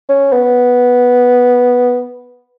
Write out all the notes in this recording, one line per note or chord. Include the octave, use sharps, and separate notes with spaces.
C#4
B3